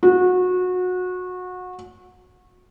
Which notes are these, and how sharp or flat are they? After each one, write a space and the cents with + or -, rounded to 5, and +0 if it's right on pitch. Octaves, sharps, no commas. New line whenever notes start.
F#4 -25